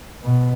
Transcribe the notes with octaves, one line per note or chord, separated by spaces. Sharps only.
B2